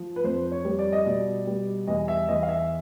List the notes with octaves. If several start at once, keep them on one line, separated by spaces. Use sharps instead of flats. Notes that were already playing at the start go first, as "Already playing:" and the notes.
Already playing: F3
B4
F2 C5
C#5
G3
D5
D#5
B2 D5
G3
E2 D#5
E5
E2 D#5
F5
E5